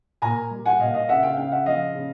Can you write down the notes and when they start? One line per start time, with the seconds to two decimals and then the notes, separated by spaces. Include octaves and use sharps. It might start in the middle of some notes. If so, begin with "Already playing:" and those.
0.22 A#2 G#5 A#5
0.51 G3
0.65 F#5 G#5
0.79 A#2 D#5 F5
0.94 D#5 F5
1.09 C#3 E5 F#5
1.23 F5 G5
1.37 C#3 F5 G5
1.52 E5 F#5
1.66 F3 D#5 F5
1.95 C#3